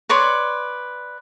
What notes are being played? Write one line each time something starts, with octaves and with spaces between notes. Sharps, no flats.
B4 C#5 D5 C6